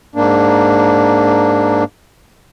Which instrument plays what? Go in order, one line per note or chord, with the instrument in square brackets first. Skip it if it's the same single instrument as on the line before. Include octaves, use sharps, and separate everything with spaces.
[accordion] G#2 A#3 D4